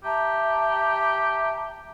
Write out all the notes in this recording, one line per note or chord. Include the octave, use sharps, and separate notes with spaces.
G4 E5 A5 A#5